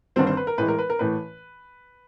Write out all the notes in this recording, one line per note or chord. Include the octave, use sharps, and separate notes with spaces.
G1 G2 D#3 G3 C4 C5
C4 C5
B4
A#4
A2 E3 G#3 B4
A#4
B4
A#4
A2 E3 A3 B4